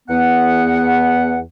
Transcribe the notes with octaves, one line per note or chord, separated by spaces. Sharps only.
E2 B3 F#5